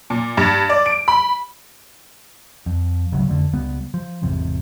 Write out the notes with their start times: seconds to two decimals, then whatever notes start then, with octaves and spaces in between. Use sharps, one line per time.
0.10 A#2
0.37 G2
0.69 D5
0.86 D7
1.08 B5
2.66 F2
3.12 G#1 D2 C#3 F#3
3.29 F2 D3 A3
3.53 C#2 G3 B3
3.94 F3
4.23 G#1 E2 C3